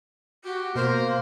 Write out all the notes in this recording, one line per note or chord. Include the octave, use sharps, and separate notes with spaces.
F#4 G4
B2 A#3 A#4 C5